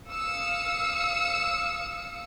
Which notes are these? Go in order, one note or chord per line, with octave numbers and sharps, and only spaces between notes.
F5 D#6 E6 C#7